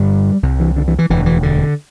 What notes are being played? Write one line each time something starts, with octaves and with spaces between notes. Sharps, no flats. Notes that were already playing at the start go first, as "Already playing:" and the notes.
Already playing: G1 G2 D3 G3
C2 C3
E3
D3
E3
E3
E1 D2 D3 E3
E3
D3